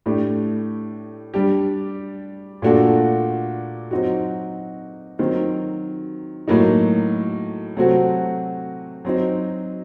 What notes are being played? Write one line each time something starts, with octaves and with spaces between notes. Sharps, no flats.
A2 A3 D4 G4
G3 D4 G4
A#2 A3 D4 F#4 A4
F#3 C4 D#4 F#4
D#3 F#3 C4
A2 F#3 A#3 D#4
C3 F#3 A3 C4 F#4
F#3 C4 D#4